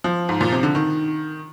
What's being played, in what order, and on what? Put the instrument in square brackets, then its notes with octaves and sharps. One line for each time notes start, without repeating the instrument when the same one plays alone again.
[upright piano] F3
G#2
A#2
C3
D3
D#3